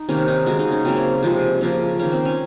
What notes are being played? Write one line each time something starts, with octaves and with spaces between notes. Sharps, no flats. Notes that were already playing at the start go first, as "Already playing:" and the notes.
Already playing: D#4
C3 D#3 A#3 C#4
D#4
C#3 G#3 F#4
D#4
C#4
C#3 F#3 A#3 C4
C3 F3 G#3
C#3 F3 A#3
D#3 A#3 C#4
C4
C#4